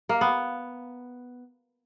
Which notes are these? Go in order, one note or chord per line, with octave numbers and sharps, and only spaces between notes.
A#3
B3